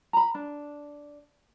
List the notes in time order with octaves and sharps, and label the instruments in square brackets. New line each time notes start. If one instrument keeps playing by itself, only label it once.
[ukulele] A#5 B5
D4